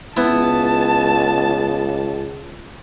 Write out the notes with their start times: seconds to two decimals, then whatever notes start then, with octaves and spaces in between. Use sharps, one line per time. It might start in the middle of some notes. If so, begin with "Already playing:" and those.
0.17 C#2 B3 E4 A5